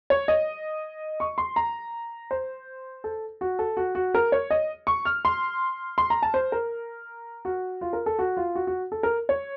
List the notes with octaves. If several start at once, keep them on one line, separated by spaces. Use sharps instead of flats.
C#5
D#5
C#6
C6
A#5
C5
A4
F#4
A4
F#4
F#4
A#4
C#5
D#5
C#6
F6
C6
C6
A#5
A5
C5
A#4
F#4
F4
A#4
A4
F#4
F4
F#4
F#4
A4
A#4
C#5